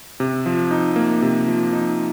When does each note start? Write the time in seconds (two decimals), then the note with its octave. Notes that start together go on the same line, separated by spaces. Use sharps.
0.20 C3
0.46 F3
0.71 D#4
0.96 A#3
1.22 C3
1.48 F3
1.73 D#4